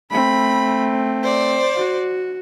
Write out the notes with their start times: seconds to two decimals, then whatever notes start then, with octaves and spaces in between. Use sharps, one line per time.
0.11 A3 C4 B5
1.23 C5 D5
1.75 F#4